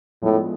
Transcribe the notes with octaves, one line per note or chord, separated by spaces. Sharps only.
A2 F3 G#3 B3 D4